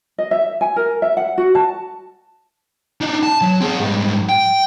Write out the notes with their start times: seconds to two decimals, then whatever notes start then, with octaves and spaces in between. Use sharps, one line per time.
0.18 D#5
0.31 E5
0.61 G#5
0.76 A#4
1.02 E5
1.17 F#5
1.38 F#4
1.55 A5
3.01 D4 D#4
3.23 A5
3.41 F#3
3.61 C4 G#4
3.80 G#2 G3
4.29 G5